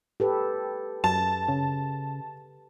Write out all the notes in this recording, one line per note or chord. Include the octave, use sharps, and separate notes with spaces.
G4 A4 B4
F#2 A5
C#3